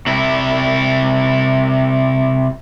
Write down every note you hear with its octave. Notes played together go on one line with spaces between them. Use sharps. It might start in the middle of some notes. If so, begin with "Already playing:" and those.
C3 E4